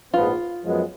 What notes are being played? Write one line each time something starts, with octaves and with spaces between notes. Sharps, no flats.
A#1 G#2 F3 B3 F4
F#2 F3 G#3 B3